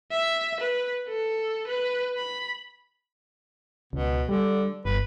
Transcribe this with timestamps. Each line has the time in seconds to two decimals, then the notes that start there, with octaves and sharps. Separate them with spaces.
0.11 E5
0.60 B4
1.08 A4
1.68 B4
2.17 B5
3.93 C#2 B2
4.29 D3 G3
4.85 G1 B4